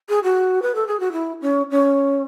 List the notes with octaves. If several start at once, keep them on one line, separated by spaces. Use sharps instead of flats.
G#4
F#4
B4
A4
G#4
F#4
E4
C#4
C#4